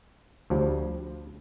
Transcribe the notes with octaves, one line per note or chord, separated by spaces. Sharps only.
D2 F3 G3